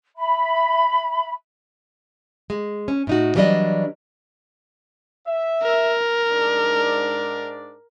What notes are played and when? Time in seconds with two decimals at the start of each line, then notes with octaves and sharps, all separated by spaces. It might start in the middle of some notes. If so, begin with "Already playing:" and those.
0.17 E5 B5
2.50 G#3
2.88 C#4
3.07 A2 D#4 F#4
3.35 E3 F#3 G3 A3 D4 D#5
5.27 E5
5.63 A#4
6.30 G#2 D4 D5